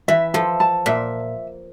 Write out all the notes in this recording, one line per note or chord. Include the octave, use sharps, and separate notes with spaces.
E3 E5
F3 A4
A5
A#2 E5